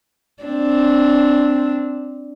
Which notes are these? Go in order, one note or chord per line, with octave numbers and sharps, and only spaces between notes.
C4 D4